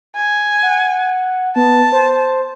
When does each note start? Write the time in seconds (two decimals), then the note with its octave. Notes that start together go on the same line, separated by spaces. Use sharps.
0.17 G#5
0.62 F#5
1.56 B3 A5
1.92 C5